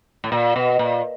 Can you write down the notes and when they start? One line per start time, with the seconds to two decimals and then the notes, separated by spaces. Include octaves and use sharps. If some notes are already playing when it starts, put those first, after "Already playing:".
0.24 A2
0.32 A#2
0.56 B2
0.79 A#2